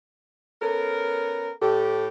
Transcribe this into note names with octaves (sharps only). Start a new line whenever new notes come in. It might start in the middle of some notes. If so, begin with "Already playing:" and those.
B3 C#4 A4 A#4
A2 G4 A4